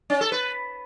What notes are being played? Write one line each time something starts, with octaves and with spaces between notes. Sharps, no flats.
C#4
A4
B4